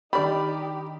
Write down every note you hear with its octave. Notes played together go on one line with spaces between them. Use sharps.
D#3 G3 D4 D#4 G4 D5 B5